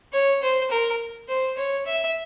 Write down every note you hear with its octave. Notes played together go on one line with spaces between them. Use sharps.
C#5
C5
A#4
C5
C#5
E5